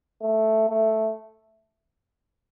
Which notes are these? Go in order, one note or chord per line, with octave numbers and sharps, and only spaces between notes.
A3
A3